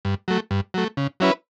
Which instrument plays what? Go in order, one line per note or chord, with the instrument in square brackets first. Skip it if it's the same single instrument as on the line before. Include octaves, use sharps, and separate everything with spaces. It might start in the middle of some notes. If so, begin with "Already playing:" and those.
[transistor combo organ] G2
F#3 A3
G2
F#3 A3
C#3
F#3 C#4 E4 B4